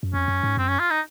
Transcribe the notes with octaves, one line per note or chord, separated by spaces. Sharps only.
F#2
F2 C#4
F#2
G#2
F#2 C4
C#4
F4
D#4